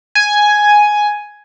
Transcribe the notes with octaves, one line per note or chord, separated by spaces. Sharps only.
G#5